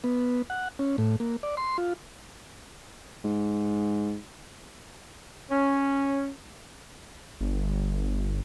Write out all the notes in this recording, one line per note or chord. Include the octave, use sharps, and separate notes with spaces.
B3
F#5
C#4
A2
A#3
D5
C6
F4
G#2
C#4
G1